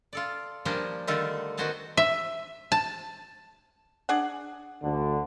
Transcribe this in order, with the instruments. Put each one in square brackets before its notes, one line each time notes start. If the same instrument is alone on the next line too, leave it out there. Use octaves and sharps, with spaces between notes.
[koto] F4 A4 D5
F3 G3 A#3 D4 C5 G#5
D3 D#3 G3 A3 F4 A4
D#3 B3 F#4 C5 G#5 A5
E5
A5
[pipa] D4 G#4 F#5
[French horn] D2 [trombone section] D3